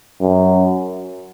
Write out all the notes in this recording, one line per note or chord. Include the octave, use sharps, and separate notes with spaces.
F#2